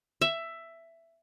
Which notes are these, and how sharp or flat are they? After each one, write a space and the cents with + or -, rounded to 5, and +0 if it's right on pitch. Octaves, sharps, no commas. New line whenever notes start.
E5 +10